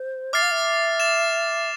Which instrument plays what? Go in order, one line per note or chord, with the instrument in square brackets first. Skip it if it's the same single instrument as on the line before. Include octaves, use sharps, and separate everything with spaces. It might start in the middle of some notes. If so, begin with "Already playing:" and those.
Already playing: [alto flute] C5
[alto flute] E5 [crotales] D6 F6 A6 C7
[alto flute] F5
E5
[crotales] A6 E7